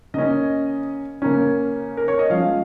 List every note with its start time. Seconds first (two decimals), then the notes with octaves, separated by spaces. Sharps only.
0.14 C#3 A#3 C#4 D#5
1.22 C#3 A#3 C#4
1.97 A#4
2.08 C#5
2.19 D#5
2.30 F3 G#3 C#4 F5